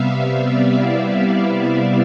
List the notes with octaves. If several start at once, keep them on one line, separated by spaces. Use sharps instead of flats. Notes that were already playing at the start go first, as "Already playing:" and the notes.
Already playing: C3 G3 B3 E5 F5
E5
D5
E4
E4